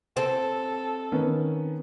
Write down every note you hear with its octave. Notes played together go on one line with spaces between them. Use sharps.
C4 A4
D#3 B3 C#4